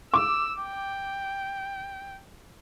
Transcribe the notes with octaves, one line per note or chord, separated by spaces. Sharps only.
D6 E6
G5